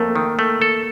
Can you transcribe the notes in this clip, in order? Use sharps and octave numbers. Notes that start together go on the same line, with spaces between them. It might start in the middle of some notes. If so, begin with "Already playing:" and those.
Already playing: F2 A3 A#3
D#3
A3
A4